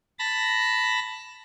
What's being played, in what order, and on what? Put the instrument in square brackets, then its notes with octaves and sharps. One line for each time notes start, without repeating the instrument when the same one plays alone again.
[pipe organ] A5 B5 A#6